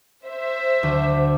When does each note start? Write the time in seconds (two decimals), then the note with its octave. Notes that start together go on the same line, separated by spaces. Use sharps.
0.24 C5 E5
0.83 D2